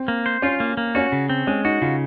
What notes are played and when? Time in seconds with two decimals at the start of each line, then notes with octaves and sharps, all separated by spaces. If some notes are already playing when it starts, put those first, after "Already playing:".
Already playing: C4
0.08 A#3
0.26 C5
0.42 C#4 F4
0.60 A#3
0.77 A#3
0.95 C#4 F#4
1.12 C#3
1.29 C4
1.47 G#3 C#4
1.64 D#4 F#4
1.82 C#3 F4